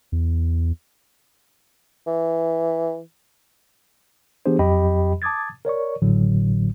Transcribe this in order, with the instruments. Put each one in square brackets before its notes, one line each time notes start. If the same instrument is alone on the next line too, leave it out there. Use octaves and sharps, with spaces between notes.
[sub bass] E2
[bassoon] E3
[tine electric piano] E3 B3 D4 G4 G#4 C5
F2 F#3 G4 D#5 G5 B5
A5 D6 D#6 G#6 A6
A#4 C#5 D5 C#6
G#1 A2 D3 F#3